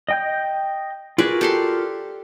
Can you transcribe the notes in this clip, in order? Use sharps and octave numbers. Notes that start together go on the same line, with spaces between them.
D#5 G5 G6
F4 F#4 G#4 A#4 B4 D5
G4 A4 C6